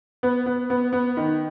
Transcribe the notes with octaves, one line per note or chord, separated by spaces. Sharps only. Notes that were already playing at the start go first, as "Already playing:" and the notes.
B3
B3
B3
B3
D#3